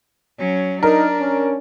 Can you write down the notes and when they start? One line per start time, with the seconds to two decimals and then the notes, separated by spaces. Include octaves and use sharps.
0.38 F#3 C#4
0.83 D4 D#4 A#4
1.20 C#4